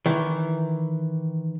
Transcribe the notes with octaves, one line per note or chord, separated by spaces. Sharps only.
D#3 E3